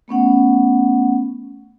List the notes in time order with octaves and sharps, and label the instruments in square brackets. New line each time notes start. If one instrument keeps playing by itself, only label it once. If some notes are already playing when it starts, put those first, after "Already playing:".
[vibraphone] A3 B3 C#4 F#5